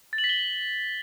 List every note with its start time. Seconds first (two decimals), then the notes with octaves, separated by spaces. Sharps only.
0.13 A6
0.18 F#7
0.24 B6
0.29 G7